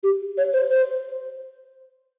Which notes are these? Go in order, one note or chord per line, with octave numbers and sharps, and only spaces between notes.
G4
C#5
C5
C5